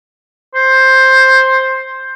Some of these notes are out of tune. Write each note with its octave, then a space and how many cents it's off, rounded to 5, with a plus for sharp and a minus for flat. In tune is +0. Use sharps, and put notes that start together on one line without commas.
C5 +10